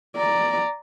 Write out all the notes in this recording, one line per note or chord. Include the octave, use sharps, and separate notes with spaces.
D5 A#5